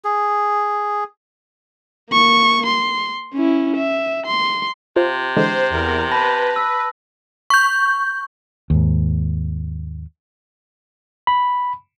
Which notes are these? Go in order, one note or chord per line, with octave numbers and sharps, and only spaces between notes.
G#4
A#3 C#6
C6
C#4 E4
E5
C6
C3 F4 C5
D3 E3 G#3 C5
E2 A#4
B4 A5 B5 A#6
E6
C#6 G6
D#2 G#2
B5